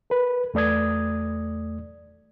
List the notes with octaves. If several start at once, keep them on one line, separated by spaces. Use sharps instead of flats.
A#4 B4
E2 A3 D5 D#6 G#6